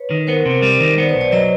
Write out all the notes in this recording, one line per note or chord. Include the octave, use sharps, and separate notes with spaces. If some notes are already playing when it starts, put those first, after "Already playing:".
Already playing: B4 C#5
D#3
B3 A#4 C5
C3
G3
D#3
B3 C5 D5
B4 C#5
B1
C5 D5
F#3 C#5 D#5